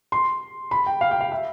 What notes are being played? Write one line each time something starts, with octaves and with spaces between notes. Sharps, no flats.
C6
B5
G5
F5
G5
F5
E5